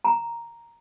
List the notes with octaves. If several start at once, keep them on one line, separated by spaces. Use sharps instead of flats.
A#5